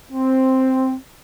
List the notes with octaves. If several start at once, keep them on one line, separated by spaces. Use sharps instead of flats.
C4